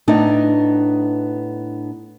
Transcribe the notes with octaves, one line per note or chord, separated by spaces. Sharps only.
A2 B3 D4 D#4